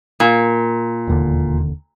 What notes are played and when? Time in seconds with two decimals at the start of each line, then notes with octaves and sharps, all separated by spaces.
0.20 A#2
1.08 E1 D#2 D3